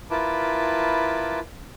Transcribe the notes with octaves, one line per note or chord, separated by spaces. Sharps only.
E4 F4 A#4 B4 A5 D6